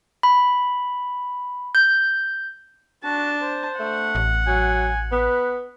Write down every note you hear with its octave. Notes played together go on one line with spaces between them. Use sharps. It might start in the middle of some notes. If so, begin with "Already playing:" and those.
B5
G6
D4 F#4 A5
C5
A3 F#5
A1
F#3 G#5
B3 B4